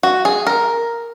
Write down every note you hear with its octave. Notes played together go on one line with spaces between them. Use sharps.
F#4
G#4
A#4